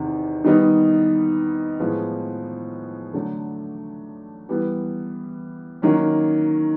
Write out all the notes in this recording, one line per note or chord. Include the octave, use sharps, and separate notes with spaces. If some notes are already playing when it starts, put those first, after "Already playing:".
Already playing: E2 C3 D#3
D#3 G3 B3 D#4
A2 F3 G#3 B3
D3 F#3 A3 D4
E3 G3 B3
D#3 F#3 A#3 C#4